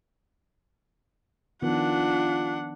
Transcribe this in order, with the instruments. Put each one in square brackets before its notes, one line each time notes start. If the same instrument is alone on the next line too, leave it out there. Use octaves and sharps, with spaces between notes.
[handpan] D#3 F3 B3 [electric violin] D4 F#5 [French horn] F4